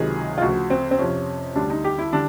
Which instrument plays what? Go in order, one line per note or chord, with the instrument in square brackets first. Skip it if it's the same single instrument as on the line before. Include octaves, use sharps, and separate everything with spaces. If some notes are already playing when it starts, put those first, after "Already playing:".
Already playing: [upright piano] C#2 C3 D#3 F#3 G#4
F4
D2 C#3 F3 F#4
C4
C4
F2 C3 F3 C#4
D2 D3 G3 D4
D#4
G4
E4
D3 G3 D4